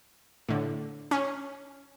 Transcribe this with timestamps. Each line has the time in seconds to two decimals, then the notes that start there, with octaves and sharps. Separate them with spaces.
0.49 A2 D3
1.11 C#4